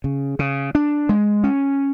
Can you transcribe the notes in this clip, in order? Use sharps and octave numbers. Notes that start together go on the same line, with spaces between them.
C#3
C#3
D4
G#3
C#4